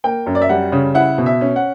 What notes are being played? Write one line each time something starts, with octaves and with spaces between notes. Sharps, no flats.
A#3 G5
F#2
D5
E5
G3 F#5
C#3
E4 F#5
B2
E5
C#4
F#5